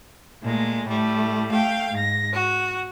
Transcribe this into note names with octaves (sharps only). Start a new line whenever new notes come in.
A#2 G#3 A3
A2 G3 A3
A3 F5 G5
G#2 A#6
F#4